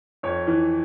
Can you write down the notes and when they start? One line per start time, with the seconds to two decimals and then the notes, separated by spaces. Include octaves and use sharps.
0.23 F2 C#5
0.47 E3